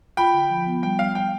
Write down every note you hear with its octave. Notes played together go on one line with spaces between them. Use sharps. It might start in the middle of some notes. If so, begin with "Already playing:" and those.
F4 G5 B5
D3
F3
B3
G3 G5
G3 F5
G3 G5